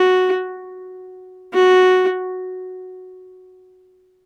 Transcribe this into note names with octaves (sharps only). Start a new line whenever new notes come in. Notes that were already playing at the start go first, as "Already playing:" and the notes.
Already playing: F#4
F#4